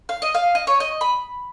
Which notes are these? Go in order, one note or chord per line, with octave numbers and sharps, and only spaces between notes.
F5
D#5
F5
D#5
C#5
D#5
B5